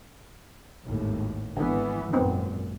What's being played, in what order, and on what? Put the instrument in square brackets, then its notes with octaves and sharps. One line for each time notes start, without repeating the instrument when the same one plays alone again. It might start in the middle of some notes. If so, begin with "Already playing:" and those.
[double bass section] G#1 D#2 A2
[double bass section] G#1 E3 B3 [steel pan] D3
[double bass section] G#1 F#2 A#2 [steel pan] B3 C4 D#4